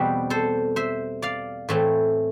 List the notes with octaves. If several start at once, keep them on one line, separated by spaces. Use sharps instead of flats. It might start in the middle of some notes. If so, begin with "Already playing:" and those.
Already playing: E2 B2 G3 C4 G4 B4
A4 C5
C5 E5
D5 F5
A2 E3 A3 C4